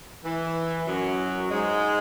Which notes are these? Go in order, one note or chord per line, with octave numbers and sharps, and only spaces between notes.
E3
F#2 F#3
G#2 G#3